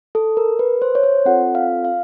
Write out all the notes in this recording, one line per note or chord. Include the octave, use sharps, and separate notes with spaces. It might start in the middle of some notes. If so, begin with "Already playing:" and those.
A4
A#4
B4
C5
C#5
C5
C4 F4 A4 F#5
F5
F5